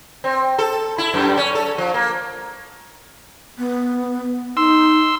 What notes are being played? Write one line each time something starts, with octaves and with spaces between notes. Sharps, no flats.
C4
A4
E4
F#2
C#4
A4
F3
A#3
B3
D#4 C6 E6